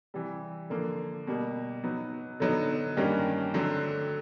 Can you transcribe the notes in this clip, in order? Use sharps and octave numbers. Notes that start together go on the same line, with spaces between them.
C3 E3 G3
D3 F3 A#3
B2 G3 A#3
F#3 B3 D#4
D3 F#3 B3 D#4
G2 D#3 G3 A#3 C#4
D3 F#3 A3 C4